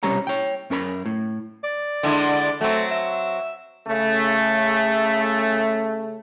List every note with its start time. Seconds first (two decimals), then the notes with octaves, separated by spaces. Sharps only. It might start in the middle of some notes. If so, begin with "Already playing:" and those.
0.03 B1 C3 G3 C#4 C#5 A#5
0.27 C#5 G5
0.70 F#2 C#4 A#4 B5
1.06 A2
1.64 D5
2.03 D3 G#3 E4
2.61 F#3 A3 C4
2.91 E5
3.88 C#3 A3